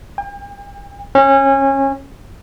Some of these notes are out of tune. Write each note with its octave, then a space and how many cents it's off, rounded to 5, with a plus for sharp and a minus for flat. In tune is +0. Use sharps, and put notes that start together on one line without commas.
G5 +40
C#4 -25